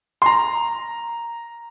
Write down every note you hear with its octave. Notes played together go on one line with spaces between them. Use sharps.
C6
A#5